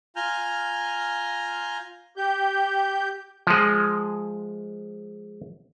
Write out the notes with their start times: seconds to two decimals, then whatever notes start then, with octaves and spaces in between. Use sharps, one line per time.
0.16 F4 G#5 A#5 F6 G6
2.17 G4 G6
3.47 F3 G#3